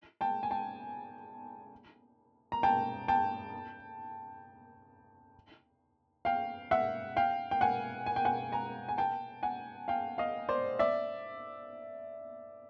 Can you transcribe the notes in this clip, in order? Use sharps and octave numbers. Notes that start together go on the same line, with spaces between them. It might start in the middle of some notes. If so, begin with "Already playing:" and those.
G5 A5
G#5
G5 A5
A#5
G5 A5
G5 A5
F5 G5
E5 F#5
F5 G5
G5
F#5 G#5
G#5
G5
F#5 G#5
G#5 A#5
G#5
G5 A5
F#5 G#5
F5 G5
D#5 F5
C5 D5
D5 E5